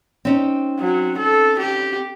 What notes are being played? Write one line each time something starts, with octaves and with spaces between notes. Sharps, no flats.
C4 C#4 D#4
F#3
A4
G4